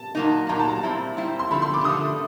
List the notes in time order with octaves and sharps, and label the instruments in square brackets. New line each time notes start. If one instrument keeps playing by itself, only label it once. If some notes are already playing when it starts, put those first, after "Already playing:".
Already playing: [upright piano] A5
[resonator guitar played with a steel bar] A#2 F#3 A#3 D#4
[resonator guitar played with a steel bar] A#2 F#3 A#3 D#4 [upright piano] A#5
[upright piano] A5
A#5
[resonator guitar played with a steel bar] A#2 G3 C4 E4
A#2 G3 C4 E4
[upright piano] C6
[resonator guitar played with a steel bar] D3 F3 A3 [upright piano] B5
[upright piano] C6
D6
[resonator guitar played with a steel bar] D3 F3 A3 [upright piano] D#6